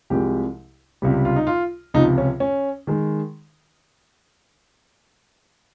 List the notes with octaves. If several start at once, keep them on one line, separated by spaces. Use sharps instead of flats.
C2 C3 F3 G#3 G4
C#2 C3 G3
F4
D#4
F4
C#2 C3 F3 D#4
C#4
C#4
D#3 G#3